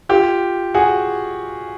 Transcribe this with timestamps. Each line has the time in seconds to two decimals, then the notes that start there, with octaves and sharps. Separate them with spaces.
0.09 F4 G4
0.74 F#4 G#4